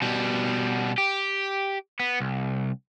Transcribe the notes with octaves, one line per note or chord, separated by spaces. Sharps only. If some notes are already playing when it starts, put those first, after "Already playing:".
B2 G3
G4
B3
C2